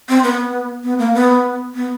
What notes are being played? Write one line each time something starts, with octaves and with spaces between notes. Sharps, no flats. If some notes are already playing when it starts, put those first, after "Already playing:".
C4
B3
B3
A#3
B3
B3